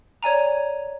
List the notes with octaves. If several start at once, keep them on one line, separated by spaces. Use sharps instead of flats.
C#5 D5 G#5 A#5